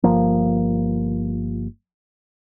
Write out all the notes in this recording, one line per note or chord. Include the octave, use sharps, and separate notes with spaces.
G1 F3 A#3